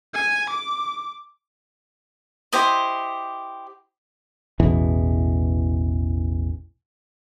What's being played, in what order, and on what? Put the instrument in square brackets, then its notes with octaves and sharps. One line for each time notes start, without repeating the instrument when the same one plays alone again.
[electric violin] G#5
D6
[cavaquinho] E4 G4 C5 D#5
[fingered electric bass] A1 E2 B2 E3